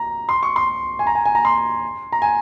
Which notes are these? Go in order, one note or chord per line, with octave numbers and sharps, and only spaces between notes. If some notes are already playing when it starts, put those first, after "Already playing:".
Already playing: A#5
C6
C#6
C6
G#5
A#5
G#5
G#5
A#5
C6
A#5
G#5